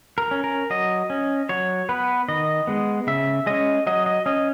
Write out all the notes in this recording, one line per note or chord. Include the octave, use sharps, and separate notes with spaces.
A#4
C#4
A#4
F#3 D#5
C#4
F#3 C#5
B3 B4
D#3 D#5
G#3 B3
C#3 E5
G#3 C#4 D#5
F#3 D#5
D#5
C#4 D#5